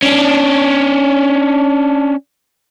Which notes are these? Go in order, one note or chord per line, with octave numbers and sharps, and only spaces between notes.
C#4 D4